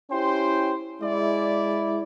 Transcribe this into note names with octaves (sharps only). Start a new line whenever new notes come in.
C#4 E4 G4 C5 G5 C6
G#3 E4 D5